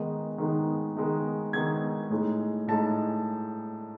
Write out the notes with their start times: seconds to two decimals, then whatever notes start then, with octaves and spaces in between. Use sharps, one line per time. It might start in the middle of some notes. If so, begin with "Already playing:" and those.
Already playing: D#3 G#3 B3 D#4
0.38 D#3 G#3 B3 D#4
0.97 D#3 G#3 B3 D#4
1.53 D#3 G#3 B3 D#4 G#6
2.10 A2 G#3 D#4
2.68 A2 G#3 D#4 A5